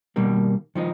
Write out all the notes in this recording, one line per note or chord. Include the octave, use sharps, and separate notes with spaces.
B2 D#3 G3 A#3
D#3 F3 D#4